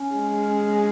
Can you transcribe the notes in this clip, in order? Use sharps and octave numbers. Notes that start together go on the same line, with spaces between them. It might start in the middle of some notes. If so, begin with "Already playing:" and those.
Already playing: C#4
G#3